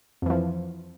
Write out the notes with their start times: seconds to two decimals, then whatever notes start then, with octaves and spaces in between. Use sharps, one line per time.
0.22 F2
0.26 E3
0.30 F3